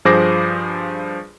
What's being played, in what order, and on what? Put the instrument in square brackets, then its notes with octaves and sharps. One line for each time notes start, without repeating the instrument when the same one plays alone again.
[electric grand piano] G2 F3 G#4 C5 D6 A#6